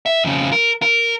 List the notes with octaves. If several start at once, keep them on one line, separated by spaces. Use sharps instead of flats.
E5
F2 C#3
A#4
A#4